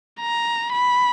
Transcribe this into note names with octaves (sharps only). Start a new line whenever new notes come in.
A#5
B5